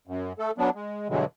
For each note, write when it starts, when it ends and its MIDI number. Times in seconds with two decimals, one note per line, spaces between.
0.07 0.33 42
0.39 0.51 57
0.39 0.51 69
0.58 0.70 54
0.58 0.70 59
0.58 0.70 62
0.75 1.09 56
1.09 1.25 43
1.09 1.25 47
1.09 1.25 50
1.09 1.25 52
1.09 1.25 54
1.09 1.25 56